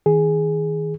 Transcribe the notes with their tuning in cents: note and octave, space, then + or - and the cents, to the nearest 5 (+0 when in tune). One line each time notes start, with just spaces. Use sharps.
D#3 +30 G#4 +0